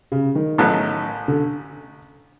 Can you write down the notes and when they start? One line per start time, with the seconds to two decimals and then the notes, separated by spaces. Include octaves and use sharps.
0.12 C#3
0.35 D#3
0.58 A1 A2 F#3 B3 D#4
1.28 D3